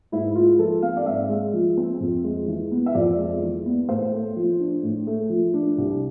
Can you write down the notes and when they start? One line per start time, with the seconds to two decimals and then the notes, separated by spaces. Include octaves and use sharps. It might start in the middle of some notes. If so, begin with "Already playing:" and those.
0.12 G#2 E4
0.35 G#3 F4
0.59 F3 A4
0.82 C4 F5
0.97 D5
1.06 G#2 E5
1.30 G#3
1.54 F3
1.77 C4
2.00 F2
2.24 G#3
2.48 E3
2.71 B3
2.86 E5
2.95 F2 D5
3.18 G#3
3.42 E3
3.66 B3
3.89 A2 C5
4.12 A3
4.36 F3
4.60 D4
4.83 A2
5.07 A3
5.30 F3
5.54 D4
5.78 C2